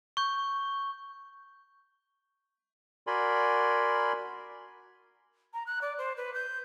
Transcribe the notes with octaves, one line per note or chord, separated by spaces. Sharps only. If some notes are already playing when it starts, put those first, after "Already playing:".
C#6 G6
F#4 A#4 D5 G#5 B5 C6
A#5
F#6
D5
C5
B4
G6